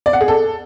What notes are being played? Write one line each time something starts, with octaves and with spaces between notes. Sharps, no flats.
D5
F#5
G#4
A4